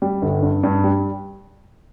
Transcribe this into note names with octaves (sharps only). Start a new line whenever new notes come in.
G3
G1
G2
G2
G3